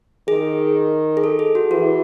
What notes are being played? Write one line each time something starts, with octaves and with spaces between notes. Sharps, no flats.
D#3 G#4
G#4
A4
G#4
F#4
E3 F#4